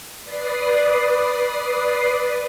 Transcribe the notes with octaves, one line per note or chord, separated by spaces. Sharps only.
B4 D5 D#6 C7